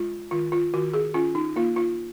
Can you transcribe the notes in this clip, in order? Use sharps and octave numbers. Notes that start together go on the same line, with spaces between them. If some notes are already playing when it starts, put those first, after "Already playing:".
Already playing: G#3 F4
D#3 F4
F4
D#3 F#4
G#4
C#4 F4
D#4
A#3 F4
F4